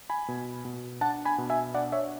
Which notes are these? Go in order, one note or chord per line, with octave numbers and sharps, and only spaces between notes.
G#5 B5
B2
B2
D4 F#5 A5
G#5 B5
B2
E5 G#5
D4 D5 F#5
C#5 E5